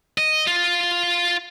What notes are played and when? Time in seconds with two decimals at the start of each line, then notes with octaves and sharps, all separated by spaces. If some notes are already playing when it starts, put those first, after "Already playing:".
0.18 D#5
0.47 F4